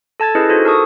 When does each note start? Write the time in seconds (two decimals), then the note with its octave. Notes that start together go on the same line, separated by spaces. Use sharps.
0.20 A4 A5 G#6 A6
0.35 C#4 E4 G#4 B4 D#5 G6
0.49 D#4 F4 F#4 A4 C5
0.65 A#4 A5 C#6 D#6